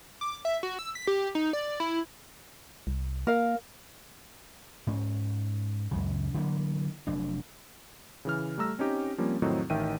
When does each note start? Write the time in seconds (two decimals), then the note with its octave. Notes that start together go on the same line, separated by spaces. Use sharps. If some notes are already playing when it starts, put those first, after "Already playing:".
0.21 D6
0.45 E5
0.63 F#4
0.79 E6
0.95 B6
1.07 G4
1.35 D#4
1.53 D5
1.80 E4
2.87 C2
3.27 A#3 A#4 F5
4.87 G#2 C#4
5.91 C#2 F#2 C#3
6.34 D3 E3 F#3 A#3
7.07 F1 F#3 D4
8.25 C#3 E3 F6
8.58 G3 A3 A#5 E6 A#6
8.78 C4 C#4 D#4 G4
9.18 F3 G3 A#3 C4 C#4
9.42 F2 A2 D#3 F#3 C4 D#4
9.70 A1 D#3 E5 G5 D#7